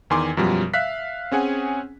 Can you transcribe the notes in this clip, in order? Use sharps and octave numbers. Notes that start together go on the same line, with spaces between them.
E2 D#3 G#5 C6 D6
F#2 B2 F3 G3
E5 F5 F#6 B6
C4 C#4 G#4 F#5 G#5